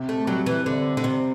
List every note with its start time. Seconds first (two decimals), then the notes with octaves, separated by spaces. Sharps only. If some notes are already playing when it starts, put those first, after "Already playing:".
Already playing: C3
0.09 A3
0.27 F#3 G3
0.46 E3
0.66 D3 C4
0.97 D3
1.04 C3 C4